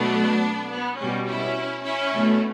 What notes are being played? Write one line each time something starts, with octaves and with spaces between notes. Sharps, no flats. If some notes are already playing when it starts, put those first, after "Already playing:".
Already playing: B2 F#3 A3 B3 D4
B3
B2 G3 C#4
C#4 E4
C#4 E4
B2 A3